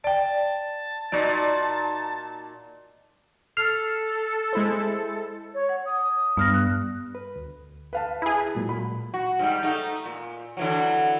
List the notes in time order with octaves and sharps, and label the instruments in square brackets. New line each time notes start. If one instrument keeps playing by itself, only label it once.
[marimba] D5 G5 [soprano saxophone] A5
[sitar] A#2 D#4 F#4 [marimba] D5
[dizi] A4 [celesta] F6 C7 F7
[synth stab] G#3 E4 C5
[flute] C#5
[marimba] F#5
[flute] D#6
[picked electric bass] G2 [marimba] B3 F6 A#6
[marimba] F#6
[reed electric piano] B4
D2
[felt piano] B4 F5 A5
[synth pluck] E4 G#4
[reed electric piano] A#2 F#3 G#3
[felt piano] B5
[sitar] F#4
G#2 G3
A3 D#4
A#2
D3 E3 F#3